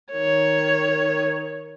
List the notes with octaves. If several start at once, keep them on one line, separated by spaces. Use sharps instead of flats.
D#3 C#5